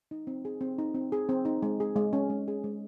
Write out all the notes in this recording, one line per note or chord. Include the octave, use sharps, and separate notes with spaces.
D#4
C4
G#4
C4
D#4
C4
G#4
C4
D#4
G#3
G#4
G#3
C#4
G#3
G#4
G#3